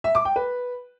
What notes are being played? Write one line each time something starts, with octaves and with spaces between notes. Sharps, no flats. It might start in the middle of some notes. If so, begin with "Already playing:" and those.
E5
D6
G5
B4